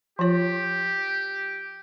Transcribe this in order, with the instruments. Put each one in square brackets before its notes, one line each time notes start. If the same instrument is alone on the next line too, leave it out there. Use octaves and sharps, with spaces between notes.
[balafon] F3 F4 C#5 [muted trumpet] G4